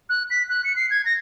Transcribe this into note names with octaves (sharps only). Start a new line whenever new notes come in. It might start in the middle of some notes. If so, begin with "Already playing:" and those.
F#6
B6
F#6
C#7
C7
G#6
A#6